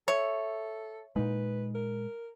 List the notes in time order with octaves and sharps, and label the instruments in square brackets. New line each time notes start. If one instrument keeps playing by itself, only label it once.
[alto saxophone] A4 [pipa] C#5 [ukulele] E5
[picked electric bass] A#2 G#3 [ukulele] D#4 [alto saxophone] B4
[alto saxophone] A#4